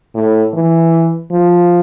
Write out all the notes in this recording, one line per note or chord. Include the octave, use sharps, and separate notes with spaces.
A2
E3
F3